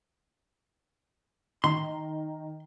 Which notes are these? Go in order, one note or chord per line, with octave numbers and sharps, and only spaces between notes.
D#3 A#5 C6